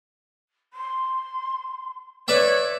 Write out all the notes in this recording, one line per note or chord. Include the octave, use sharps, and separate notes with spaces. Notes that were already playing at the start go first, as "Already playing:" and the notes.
C6
B4 C#5 D5 E5